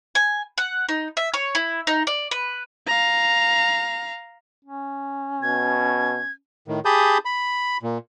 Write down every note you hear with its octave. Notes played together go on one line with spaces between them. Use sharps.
G#5
F#5
D#4
E5
C#5
E4
D#4
D5
B4
F5 A#5
C#4
B2 G#6
A2 D#3
G4 G#4 A5 B5 D#6 G6
B5
A#2